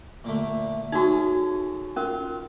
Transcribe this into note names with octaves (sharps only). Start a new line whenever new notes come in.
A#2 D3 A3
C#4 D#4 F#4 G#4 A4
C#4 F4 A#4